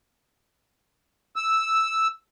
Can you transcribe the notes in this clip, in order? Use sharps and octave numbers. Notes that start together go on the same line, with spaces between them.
E6